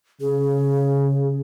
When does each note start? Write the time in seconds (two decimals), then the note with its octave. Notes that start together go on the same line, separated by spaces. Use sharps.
0.21 C#3 G#4